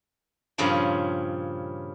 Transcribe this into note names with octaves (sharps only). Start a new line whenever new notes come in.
G2 A#2 C#3 F3